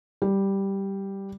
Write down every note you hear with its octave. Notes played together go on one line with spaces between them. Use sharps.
G3